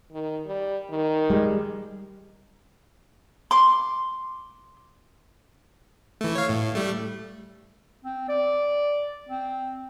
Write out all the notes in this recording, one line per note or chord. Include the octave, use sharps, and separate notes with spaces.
D#3
G3
D#3
G3 G#3
C6 D6
E3 A3
C#5 F5
A2
G3 A3
C4
D5
C4